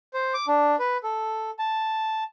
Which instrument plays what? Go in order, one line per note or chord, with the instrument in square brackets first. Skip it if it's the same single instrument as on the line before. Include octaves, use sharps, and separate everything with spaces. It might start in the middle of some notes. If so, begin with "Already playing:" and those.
[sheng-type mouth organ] C5
D6
D4
B4
A4
A5